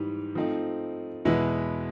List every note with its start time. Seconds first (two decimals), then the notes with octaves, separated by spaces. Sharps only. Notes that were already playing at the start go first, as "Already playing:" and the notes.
Already playing: G#2 E3 G3
0.35 F3 A3 C4 D#4
1.25 E2 B2 G#3 B3 E4